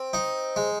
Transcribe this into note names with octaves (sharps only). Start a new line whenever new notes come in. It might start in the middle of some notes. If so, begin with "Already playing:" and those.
Already playing: C4
D#4
G#3